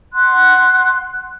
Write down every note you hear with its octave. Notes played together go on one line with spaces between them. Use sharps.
F#5 C6 F#6